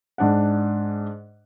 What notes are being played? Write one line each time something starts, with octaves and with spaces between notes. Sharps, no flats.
G#2 D4 F#5